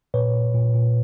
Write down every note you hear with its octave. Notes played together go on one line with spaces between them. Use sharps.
A#2 B4 C#5
A#2
A#2
A#2